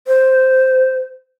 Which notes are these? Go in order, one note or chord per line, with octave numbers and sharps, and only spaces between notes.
C5